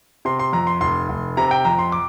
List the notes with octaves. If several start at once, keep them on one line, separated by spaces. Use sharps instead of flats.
C3 C6
C6
F2 A#5
C6
F1 C6
F1
C3 A#5
G5
F2 A#5
C6
D6